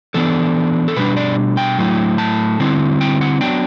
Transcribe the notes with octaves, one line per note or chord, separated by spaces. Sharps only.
E3 B3 D4 A4
A4
B2 G3 D4 B4
D5
G5
A2 F#3 A3 E4
A5
D3 G3 C4 E4
G5
F#5
F#3 B3 D4 G5